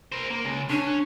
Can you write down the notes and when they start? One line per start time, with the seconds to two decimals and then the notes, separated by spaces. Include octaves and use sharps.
0.12 A#4 C5
0.30 A#3
0.45 C#3 G#3
0.70 C#4 D4